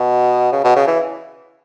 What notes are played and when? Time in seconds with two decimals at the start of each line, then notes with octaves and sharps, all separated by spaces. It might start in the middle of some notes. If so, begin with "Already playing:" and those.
Already playing: B2
0.52 C#3
0.64 B2
0.76 C#3
0.87 E3